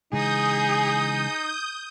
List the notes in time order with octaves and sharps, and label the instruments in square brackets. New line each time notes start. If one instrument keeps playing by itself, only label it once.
[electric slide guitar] C#3 E3 G#3 [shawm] D#4 [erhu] G#4 [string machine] D#6 G6